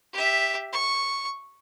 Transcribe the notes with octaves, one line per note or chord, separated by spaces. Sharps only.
G4 E5
C#6